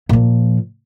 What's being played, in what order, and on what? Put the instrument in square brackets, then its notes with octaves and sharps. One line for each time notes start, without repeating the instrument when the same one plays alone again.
[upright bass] A#2 F3